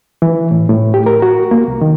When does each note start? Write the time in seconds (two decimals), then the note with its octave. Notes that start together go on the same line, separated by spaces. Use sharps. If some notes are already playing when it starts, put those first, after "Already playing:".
0.22 E3
0.51 A2
0.69 A2
0.94 G4
1.06 A#4
1.22 F#4
1.51 A#3
1.68 C2
1.81 D#3